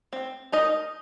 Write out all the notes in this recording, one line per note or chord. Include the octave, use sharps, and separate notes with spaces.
C4
D#4 A#4 D#5